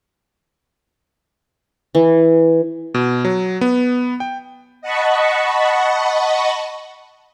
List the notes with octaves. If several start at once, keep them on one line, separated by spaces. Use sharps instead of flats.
E3
B2
F#3
B3
G5
D#5 F#5 A5 B5 C#6